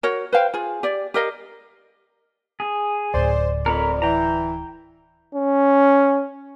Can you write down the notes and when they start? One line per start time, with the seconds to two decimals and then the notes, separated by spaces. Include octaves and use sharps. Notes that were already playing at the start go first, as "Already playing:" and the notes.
0.03 F#4 A#4 C#5
0.32 B4 C5 F5 G5
0.54 F4 G#4
0.83 G4 D5
1.14 G4 A#4 D#5 F5
2.60 G#4
3.14 D1 D2 A2 C5 D5
3.66 F2 A#4 C#5 B5
4.02 E3 G5 A#5
5.35 C#4